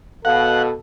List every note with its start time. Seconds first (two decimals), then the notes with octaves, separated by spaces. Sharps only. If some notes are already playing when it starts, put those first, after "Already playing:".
0.25 B2 A4 F5 F#5